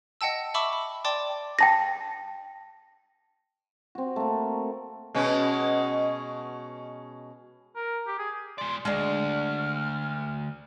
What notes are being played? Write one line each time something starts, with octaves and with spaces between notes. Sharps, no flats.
D#5 F#5 G5 A5 E6
E5 A5 B5 C#6 D6 E6
B5
D5 G5 A5 C6 D6
G5 A5 A#6
C4 F#4
A3 A#3
B2 G#3 C#4
A#4
G4
G#4
G#3 D5 C6
D2 G#3 D4 F6